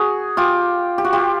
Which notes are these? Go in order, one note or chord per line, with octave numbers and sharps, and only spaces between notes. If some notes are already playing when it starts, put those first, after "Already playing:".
Already playing: F#4 G#4
F4 G4
G4
F#4
F4 G4